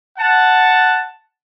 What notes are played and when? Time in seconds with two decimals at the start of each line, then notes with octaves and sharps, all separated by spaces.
0.19 F#5 A5